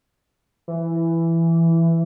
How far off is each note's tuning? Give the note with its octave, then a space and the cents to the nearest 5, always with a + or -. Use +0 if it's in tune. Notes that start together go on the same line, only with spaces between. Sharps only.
E3 +10